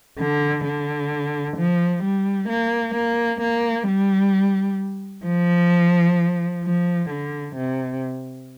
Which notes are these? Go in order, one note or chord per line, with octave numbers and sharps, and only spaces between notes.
D3
D3
F3
G3
A#3
A#3
A#3
G3
F3
F3
D3
C3